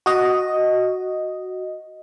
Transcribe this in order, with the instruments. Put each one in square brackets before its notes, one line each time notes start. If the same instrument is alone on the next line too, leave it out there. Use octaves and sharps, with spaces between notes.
[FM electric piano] F#4 D#5